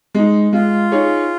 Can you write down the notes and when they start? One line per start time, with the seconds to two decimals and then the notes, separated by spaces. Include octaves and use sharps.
0.15 G#3 D#4
0.53 G#3 F4
0.92 D#4 G#4 C#5